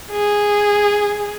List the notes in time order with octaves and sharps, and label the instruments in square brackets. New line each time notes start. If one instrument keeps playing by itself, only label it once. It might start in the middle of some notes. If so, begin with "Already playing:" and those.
[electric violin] G#4